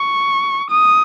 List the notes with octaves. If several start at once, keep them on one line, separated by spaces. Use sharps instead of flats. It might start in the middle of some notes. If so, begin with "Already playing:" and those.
Already playing: C#6
D#6